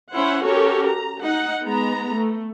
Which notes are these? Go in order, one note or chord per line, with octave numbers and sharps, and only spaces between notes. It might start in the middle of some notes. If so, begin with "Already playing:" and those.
C#4 E4 C5 F#5
C#4 F#4 G4 A4 A#4 C#5
A#5
D#4 F#5
G#3 B3 A#5
A3